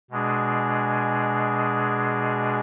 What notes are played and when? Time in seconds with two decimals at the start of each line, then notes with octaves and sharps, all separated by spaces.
0.11 B2 G#3 D4 G#4